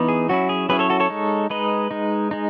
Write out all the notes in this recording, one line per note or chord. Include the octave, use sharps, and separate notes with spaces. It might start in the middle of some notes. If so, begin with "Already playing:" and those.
Already playing: E3 B3 D#4
G#4
F#3 C#4 E4 F#4
G#4
F#3 C#4 E4 G#4 B4
A4 C#5
F#4 A4
A4 C#5
G#3 D#4
G#3 D#4 B4 D#5
G#3 D#4
G#3 D#4